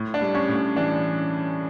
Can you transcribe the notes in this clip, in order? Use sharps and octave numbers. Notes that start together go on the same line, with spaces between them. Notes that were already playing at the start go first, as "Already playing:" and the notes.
Already playing: A2
D4
G3
C#4
A2
C#4
E3 D4